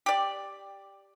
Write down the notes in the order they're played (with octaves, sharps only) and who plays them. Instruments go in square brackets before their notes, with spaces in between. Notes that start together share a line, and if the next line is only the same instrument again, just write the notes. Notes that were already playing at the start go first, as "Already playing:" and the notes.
[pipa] G4 D5